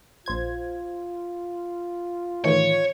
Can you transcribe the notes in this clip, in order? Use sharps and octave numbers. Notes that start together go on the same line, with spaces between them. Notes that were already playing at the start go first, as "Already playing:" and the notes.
A#1 F4 C5 G#6
A2 D#3 E3 C#5